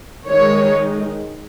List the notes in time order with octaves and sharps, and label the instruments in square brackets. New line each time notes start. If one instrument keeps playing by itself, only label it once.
[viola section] D#3 G#3 D#4 C#5